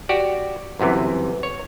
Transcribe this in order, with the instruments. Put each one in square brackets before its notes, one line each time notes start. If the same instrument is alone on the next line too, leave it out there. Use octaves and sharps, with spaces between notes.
[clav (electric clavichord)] F#4 G4 D5
G1 F#2 C3 E3
C#5